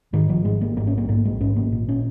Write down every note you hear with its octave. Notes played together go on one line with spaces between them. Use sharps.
G#2 D#3
G#1 F3
G#2 G#3
G#1 A#3
G#2 A#3
C#4
A#1 A#3
G#2 A#3
A#1 G#3
G#2 C#4
G#1 A#3
A#2
C#4